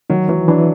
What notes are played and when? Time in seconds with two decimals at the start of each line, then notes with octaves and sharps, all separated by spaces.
0.10 D#3 F#3
0.28 E3 F#3
0.48 E3 D4